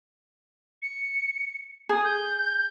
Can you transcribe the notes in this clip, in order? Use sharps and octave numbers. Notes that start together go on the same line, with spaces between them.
C#7
G#4 D#6
G6